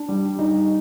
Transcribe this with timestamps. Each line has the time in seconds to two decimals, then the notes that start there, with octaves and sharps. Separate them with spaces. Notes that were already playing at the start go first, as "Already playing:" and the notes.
Already playing: D4
0.08 G3
0.39 D#4